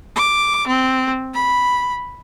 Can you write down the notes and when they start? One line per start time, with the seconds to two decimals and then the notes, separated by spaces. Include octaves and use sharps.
0.16 D6
0.67 C4
1.34 B5